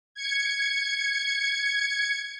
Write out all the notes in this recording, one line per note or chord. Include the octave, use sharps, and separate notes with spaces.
G#6 C#7